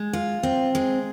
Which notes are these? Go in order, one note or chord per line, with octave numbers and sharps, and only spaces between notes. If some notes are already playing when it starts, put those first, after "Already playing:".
Already playing: G#3
F4
C4
G#3